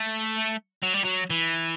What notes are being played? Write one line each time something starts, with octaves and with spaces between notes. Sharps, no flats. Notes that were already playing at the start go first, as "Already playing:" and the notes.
Already playing: A3
F#3
G3
F#3
E3